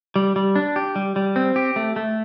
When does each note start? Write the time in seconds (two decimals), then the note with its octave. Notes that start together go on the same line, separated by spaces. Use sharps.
0.16 G3
0.36 G3
0.56 D4
0.76 G4
0.96 G3
1.16 G3
1.36 C4
1.56 G4
1.76 A3
1.96 A3